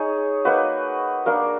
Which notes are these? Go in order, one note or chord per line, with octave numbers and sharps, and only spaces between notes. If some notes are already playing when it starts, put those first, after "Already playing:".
Already playing: D#4 G#4 C#5
A#3 D#4 F#4 B4
A#3 D4 F#4 A#4